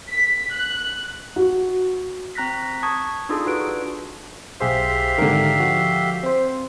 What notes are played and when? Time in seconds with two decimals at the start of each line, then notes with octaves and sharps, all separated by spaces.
0.10 B6
0.54 F#6
1.36 F#4
2.35 C4 A#5 F#6 A#6 B6
2.83 A5 C#6 D#6 G#6
3.29 D4 D#4 F4 G#4 A4
3.45 D4 F#4 B4 D7
4.60 B1 G4 G#4 C5 E5 F5
5.18 G#2 D3 D#3 A#4
5.60 F3 F#4
6.23 C4 C5